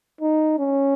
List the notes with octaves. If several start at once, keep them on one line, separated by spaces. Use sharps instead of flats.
D#4
C#4